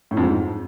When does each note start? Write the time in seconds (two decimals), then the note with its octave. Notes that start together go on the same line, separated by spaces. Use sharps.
0.11 A2
0.17 F2
0.23 G#2